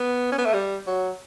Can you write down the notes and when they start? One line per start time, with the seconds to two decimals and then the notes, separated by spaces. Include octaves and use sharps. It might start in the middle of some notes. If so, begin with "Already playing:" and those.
Already playing: B3
0.32 C#4
0.38 B3
0.46 A3
0.53 G3
0.87 F#3